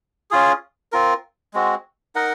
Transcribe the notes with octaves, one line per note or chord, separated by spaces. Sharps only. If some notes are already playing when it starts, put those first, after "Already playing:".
C#4 F4 G#4
C4 F4 A#4
G#3 C4 F#4
D#4 A#4 D#5 F#5